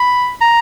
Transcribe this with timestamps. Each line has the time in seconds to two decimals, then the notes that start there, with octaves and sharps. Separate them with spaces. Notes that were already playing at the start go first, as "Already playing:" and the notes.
Already playing: B5
0.41 A#5